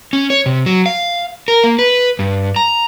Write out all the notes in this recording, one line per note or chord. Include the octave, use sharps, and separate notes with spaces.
C#4
C#5
C3
F#3
F5
A#4
A#3
B4
G2
A#5